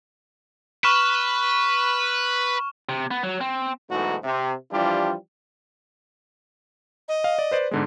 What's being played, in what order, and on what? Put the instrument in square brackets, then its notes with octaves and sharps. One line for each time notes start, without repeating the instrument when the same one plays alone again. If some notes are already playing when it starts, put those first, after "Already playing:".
[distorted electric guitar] B4 [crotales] C#6 F6 E7
[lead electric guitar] C3
B3
F#3
C4
[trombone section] B1 G#2 E3 A3 D#4 F#4
C3
E3 F3 G3 D4 F4 G4
[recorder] D#5
[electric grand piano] F5
D5
B4 C5 D5
[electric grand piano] G#2 D3 G#3 [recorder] B3